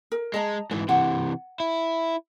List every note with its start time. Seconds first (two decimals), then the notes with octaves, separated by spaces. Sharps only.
0.12 A#4
0.34 G#3 D#5 A5 A#5
0.71 G#2 E3 B4
0.89 C3 E3 F#5
1.60 E4